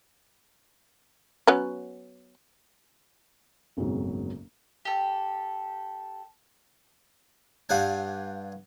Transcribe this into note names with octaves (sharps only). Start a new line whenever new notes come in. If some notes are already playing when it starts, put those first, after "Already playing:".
F#3 B3 C#4
F#1 B1 F2 G#2 C3 F#3
G4 A4
G2 D4 F5 F#5 G#5